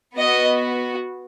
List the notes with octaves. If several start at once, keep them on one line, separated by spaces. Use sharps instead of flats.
B3 F#4 D#5